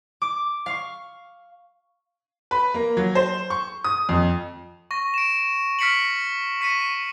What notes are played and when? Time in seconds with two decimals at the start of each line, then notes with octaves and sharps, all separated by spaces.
0.22 D6
0.66 F5 C#6
2.51 B4
2.74 A#3
2.97 F#3
3.15 C5
3.50 C#6
3.84 D#6
4.09 F2
4.91 C#6 A#6
5.14 D7 E7
5.79 F6 A#6 B6 C#7 D7 F#7
6.61 C#6 B6 C#7 D#7